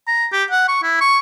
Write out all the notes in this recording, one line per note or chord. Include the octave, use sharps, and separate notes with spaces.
A#5
G4
F#5
C#6
E4
C#6